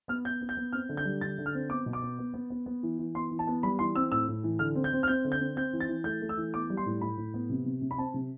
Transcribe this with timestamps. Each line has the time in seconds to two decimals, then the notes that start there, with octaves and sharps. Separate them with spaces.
0.08 B3 F6
0.25 B3 G6
0.41 B3
0.49 G6
0.57 B3
0.72 C4 F6
0.89 D3
0.97 G6
1.05 G3
1.21 D3 A6
1.38 D3
1.46 F6
1.54 C4
1.69 B3 D6
1.86 B2
1.93 D6
2.02 B3
2.19 B3
2.34 B3
2.50 B3
2.66 B3
2.83 E3
2.99 E3
3.15 B3 C6
3.31 E3
3.39 A5
3.47 B3
3.63 G3 B5
3.79 E3 C6
3.95 C4 E6
4.12 A2 E6
4.28 A2
4.44 E3
4.59 D3 F6
4.75 C4
4.84 G6
4.93 C4
5.03 F6
5.08 C4 G6
5.24 D3
5.32 G6
5.40 C4
5.56 C4 G6
5.73 E3
5.80 A6
5.89 E3
6.04 A3 G6
6.22 A3
6.29 E6
6.37 E3
6.54 B3 D6
6.70 G3
6.77 C6
6.86 A2
7.01 A2 B5
7.17 A2
7.34 B3
7.49 C3
7.66 C3
7.82 C3
7.91 B5
7.98 C4 A5
8.14 C3